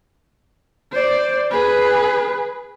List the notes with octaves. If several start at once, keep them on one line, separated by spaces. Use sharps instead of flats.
C5 D5
G#4 B4